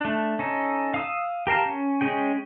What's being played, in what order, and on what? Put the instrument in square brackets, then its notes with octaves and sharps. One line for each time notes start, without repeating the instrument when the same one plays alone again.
[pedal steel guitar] A3 D4
C#4 D#4 A4
F5 D#6 E6
G4 A#4 F5 A5
C#4
G#3 C#4 G#4 G5